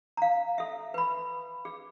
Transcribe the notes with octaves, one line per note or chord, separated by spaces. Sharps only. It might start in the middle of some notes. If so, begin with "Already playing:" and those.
F5 A#5
A4 E5
B4 B5
G#4